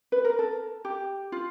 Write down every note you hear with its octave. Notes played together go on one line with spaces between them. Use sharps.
B4
A#4
A4
G4
F4